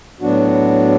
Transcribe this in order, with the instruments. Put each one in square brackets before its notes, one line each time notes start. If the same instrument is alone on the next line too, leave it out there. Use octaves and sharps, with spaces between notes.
[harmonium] A2 F#3 B3 D4 F#4